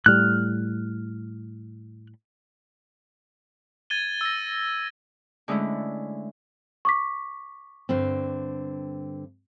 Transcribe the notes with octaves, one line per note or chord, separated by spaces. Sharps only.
A2 G3 F6 F#6
G#6 A6 D#7 G7
E6 A#6
D3 G#3 A3 C#4 E4
C#6 D6 B6
G2 D3 C4